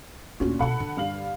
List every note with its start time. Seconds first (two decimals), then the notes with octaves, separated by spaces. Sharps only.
0.40 D2 A#2 C#4 D4 F#4
0.59 B2 E4 A4 F#5 B5
0.80 D3
0.97 G2 F5 F#7